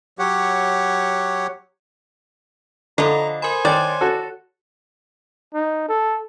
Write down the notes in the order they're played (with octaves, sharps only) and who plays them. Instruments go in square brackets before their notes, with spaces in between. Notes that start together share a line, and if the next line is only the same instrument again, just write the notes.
[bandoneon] F#3 G4 C#5 F#5
[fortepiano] D3 [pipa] F3 D#5 [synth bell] A4 F#5 B5 [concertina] A#5
[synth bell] A#4 B5 [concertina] C5 G#5
[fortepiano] D#3 [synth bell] C#5 C6 A6 [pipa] D5
[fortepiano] F#4 A4
[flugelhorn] D#4
A4